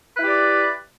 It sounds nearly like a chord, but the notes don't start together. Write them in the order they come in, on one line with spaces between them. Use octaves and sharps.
B4 E4 G4 D5